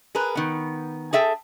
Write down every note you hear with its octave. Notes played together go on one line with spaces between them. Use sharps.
G#4 A#4 B4
D#3 B3
G#4 A4 E5 G5